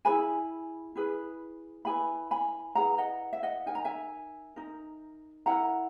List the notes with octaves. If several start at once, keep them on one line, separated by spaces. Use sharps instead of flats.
E4 G#4 B4 G#5 B5
E4 G#4 B4
E4 G#4 B4 G#5 B5
G#5 B5
E4 G#4 B4 F#5 A#5
D#5 F#5
E5
D#5 F#5
D#4 A#4 G#5
A#5
E5 G#5
D#4 A#4
E4 A#4 F#5 A#5